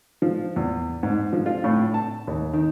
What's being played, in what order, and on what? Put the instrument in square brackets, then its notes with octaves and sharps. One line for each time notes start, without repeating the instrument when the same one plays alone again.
[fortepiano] F3
E2
G#2
F3
F4
A2
A5
D#2
D#3